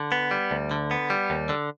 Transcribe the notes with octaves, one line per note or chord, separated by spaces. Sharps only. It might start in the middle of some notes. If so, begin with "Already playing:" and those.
Already playing: D3
B3
G3
D2
D3
B3
G3
D#2
D3